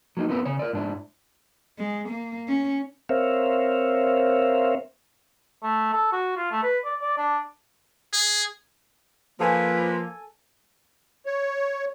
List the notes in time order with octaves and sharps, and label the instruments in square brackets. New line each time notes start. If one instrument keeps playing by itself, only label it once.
[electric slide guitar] F#3 A#3 C4 D#4
B3 C4 E4 A#4 B4
C#3 C#5
A#4 D5
G#2 D4 E4
[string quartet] G#3
A#3
C#4
[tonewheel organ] C4 A#4 C5 C#5 E5 F5
[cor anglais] A3
A4
F#4
F4
A3
B4
D5
D5
D4
[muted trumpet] G#4
[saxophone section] F3 [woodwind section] A#3 [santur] A4 G#5 [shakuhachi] B4
[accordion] C#5